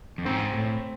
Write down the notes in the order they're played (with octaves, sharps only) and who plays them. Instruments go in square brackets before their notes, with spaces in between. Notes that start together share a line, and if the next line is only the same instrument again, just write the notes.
[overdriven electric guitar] F2
[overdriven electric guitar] G#2 [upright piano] C4
[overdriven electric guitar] A2